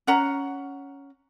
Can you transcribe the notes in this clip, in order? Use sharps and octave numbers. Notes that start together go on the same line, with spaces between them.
C#4 F#5 A#5